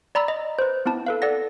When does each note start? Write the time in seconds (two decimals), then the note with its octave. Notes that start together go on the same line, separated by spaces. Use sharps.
0.15 D5 A#5 B5 E6 A6
0.28 D#5
0.59 B4 C5
0.86 B3 C4 E4 A5
1.07 A4 B4 F5
1.22 A4 D5 F#5 A#6